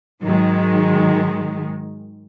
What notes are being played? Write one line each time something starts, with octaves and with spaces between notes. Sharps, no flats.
G#2 D#3 F#3 G#3